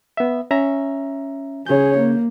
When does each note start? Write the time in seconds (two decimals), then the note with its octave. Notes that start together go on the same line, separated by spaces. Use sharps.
0.17 B3 E5
0.51 C#4 E5 A#5
1.67 C#3 G#4 C#5 G6
1.98 A#3